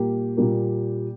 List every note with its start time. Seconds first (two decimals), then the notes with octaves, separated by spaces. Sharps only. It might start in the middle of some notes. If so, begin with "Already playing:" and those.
Already playing: A#2 G3 A#3 G4
0.37 A#2 G3 A#3